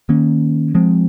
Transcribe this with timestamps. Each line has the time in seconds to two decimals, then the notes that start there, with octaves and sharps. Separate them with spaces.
0.09 D#3 A#3 C#4
0.75 F3 G#3 C4